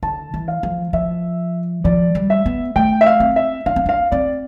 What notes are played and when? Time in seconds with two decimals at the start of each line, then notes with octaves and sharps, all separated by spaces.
0.03 D3 A5
0.34 E3
0.48 F5
0.63 F3
0.93 F3 E5
1.84 F3 D5
2.15 G3
2.30 E5
2.46 B3
2.76 A3 G5
3.01 E5
3.06 F5
3.20 C4
3.36 E5
3.66 D4 F5
3.76 C4
3.86 D4 F5
4.12 C4 D5